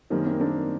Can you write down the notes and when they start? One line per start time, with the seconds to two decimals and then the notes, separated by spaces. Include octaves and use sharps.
0.10 F#2 D#3 G3 A#3 C4
0.25 A#3 C4
0.40 C4 D4